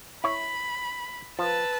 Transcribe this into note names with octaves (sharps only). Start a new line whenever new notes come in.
E4 C#5 B5
F3 B4 A5 E6